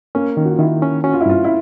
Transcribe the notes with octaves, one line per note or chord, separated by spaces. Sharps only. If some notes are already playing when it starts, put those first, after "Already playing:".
A#3 C#4
D#3
F#4
F4
D#3 E4
C#4
C#4 F#4
F4
E4
G2 F4
E4